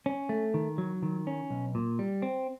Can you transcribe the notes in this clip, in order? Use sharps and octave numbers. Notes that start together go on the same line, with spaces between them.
C#4
A3
D#3
F#3
D#3
C#4
B1
A#2
G3
C4